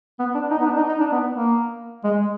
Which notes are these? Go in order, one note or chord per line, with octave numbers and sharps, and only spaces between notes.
B3
D4
D#4
B3
D4
D#4
D#4
D4
B3
A#3
G#3